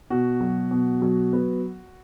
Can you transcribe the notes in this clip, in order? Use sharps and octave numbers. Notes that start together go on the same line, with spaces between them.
B2 F#4
F#3
B2
F#3
B3